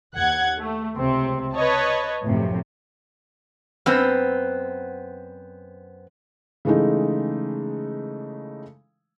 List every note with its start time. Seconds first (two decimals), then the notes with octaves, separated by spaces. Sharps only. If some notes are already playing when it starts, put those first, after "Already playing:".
0.16 D#2 F#5 F#6 G#6
0.59 A3
0.95 C#2 C3 C4
1.54 B4 C#5 D#5 A5
2.24 F#2 A2 C3 F3
3.86 F#2 B3 C4
6.65 C#3 E3 G#3 A3 D#4